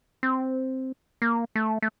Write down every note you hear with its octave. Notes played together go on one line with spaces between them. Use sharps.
C4
A#3
A3
A3